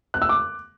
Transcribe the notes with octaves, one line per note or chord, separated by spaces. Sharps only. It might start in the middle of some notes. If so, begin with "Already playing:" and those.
F#6
E6
D6